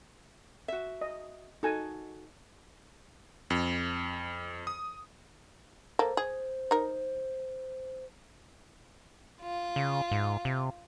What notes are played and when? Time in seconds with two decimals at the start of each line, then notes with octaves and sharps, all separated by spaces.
0.68 F#4 E5
1.01 D#5
1.63 D#4 F#4 A4 G#5
3.50 F2
4.67 D#6
5.99 A#3 A4 C5
6.17 G#4
6.71 D#4 A#4
9.41 F4
9.76 C#3
10.11 G#2
10.45 C3